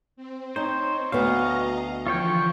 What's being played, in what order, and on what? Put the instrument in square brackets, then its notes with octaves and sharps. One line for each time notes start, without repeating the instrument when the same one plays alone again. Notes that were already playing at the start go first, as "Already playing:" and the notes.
[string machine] C4
[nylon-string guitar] D#4 [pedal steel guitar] C5 [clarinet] C#5
[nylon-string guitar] D2 B3 [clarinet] F#4 [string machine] D#5 A#5 [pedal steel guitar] F5
[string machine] D3 E3 F3 [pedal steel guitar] F4 C#5 G5 [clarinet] C#6